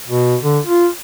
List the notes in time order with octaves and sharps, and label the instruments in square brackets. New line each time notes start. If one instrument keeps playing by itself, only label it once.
[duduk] B2
D3
F4